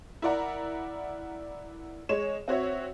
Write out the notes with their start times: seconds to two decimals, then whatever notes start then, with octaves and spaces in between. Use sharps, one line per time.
0.22 E4 A#4 D5 F#5 A#5
2.09 G#3 C#5 E7
2.48 C4 F#4 C#5 E5